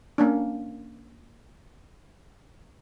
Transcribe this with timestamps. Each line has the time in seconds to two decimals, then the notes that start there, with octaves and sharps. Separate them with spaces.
0.18 A#3 C#4 D4